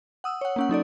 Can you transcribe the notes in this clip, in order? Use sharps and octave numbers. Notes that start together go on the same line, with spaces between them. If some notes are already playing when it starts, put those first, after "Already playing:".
F#5 D#6 E6
C#5 F#5
A#3 C#4 F#5
F#3 D#4 A4 D5